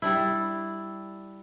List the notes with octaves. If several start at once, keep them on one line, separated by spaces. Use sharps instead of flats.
G3 D4 E4